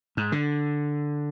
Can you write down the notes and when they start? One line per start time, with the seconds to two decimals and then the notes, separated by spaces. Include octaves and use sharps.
0.17 G#2
0.32 D3